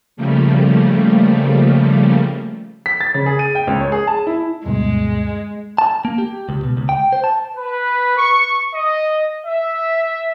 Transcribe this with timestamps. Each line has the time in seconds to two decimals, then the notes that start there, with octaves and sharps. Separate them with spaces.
0.17 C#3 F3 G3 A3 A#3
2.86 B6
3.00 A6
3.14 C#3
3.26 G#4
3.39 D#7
3.55 G5
3.67 C#2
3.80 C#5
3.92 G#4
4.07 A5
4.27 E4
4.66 D2 G2 B2 G#3
5.78 A5
6.05 A#3
6.18 G4
6.49 C#2
6.63 B2
6.77 C#2
6.89 G5
7.13 C5
7.24 A5
7.56 B4
8.17 C#6
8.74 D#5
9.46 E5